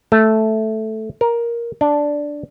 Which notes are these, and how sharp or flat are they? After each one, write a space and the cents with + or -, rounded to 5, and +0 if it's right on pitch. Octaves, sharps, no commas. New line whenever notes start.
A3 -5
A#4 +10
D4 -5